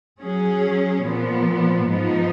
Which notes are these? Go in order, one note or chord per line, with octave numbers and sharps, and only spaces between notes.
F#3 C#4 G#4
A#2 F3 B3
G#2 F3 B3 D#4